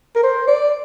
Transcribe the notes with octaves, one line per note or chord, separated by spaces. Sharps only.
A#4
C5
D5